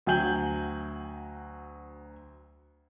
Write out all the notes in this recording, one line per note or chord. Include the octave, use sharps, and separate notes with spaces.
D2 F#3 G5 G#5 G6 F#7